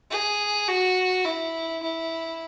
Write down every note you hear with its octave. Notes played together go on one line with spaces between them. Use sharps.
G#4
F#4
E4
E4